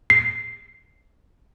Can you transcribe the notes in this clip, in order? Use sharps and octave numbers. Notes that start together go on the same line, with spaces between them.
C7